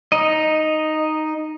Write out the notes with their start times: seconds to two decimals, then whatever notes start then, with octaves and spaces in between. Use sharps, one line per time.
0.12 D#4 D#5